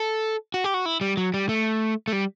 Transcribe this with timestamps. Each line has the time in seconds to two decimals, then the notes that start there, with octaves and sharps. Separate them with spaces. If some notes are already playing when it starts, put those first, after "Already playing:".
Already playing: A4
0.54 F#4
0.64 G4
0.74 F#4
0.86 E4
1.01 G3
1.17 F#3
1.34 G3
1.49 A3
2.08 A3
2.13 G3